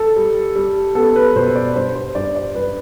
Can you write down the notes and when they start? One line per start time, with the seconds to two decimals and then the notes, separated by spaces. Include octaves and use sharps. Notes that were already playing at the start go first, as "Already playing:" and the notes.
Already playing: A4
0.16 G3
0.56 G3
0.95 B3 A4
1.16 B4
1.36 B2 C5
1.55 D5
1.75 G2 C5
1.95 C5
2.15 G2 D5
2.35 D5
2.55 G2 B4